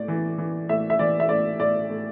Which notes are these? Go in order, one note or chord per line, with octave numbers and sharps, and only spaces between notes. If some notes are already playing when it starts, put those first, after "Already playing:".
Already playing: A2 D5
E3
E3
A2 E5
E5
E3 D5
E5
A2 D5
A2 D5
A2